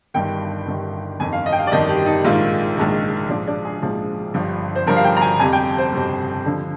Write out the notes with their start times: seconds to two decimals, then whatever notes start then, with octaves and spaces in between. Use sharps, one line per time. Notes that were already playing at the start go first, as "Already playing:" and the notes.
0.14 G1 G2 D#3 G5
0.67 G1 G2 D#3
1.19 G1 F2 D#3 G#5
1.33 F5
1.46 D#5
1.53 G5
1.59 F5
1.67 D5
1.72 G1 F2 D#3 D#5
1.89 G4
2.06 D#4
2.24 A#1 G#2 D#3 F4
2.77 A#1 G#2 D#3
3.29 A#1 G#2 F3 D4
3.47 D4
3.65 G#4
3.82 A#1 G#2 F3
4.34 G1 G2 F3
4.75 C5
4.87 G1 G2 F3 A#4
4.97 F5
5.04 G5
5.17 A#5
5.21 G#5
5.40 G1 F2 C3 G#5
5.53 G5
5.78 C5
5.92 G1 F2 C3
6.45 D#2 D3 F3